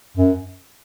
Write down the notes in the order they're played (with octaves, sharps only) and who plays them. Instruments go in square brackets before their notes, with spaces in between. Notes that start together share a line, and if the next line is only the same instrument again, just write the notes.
[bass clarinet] F#2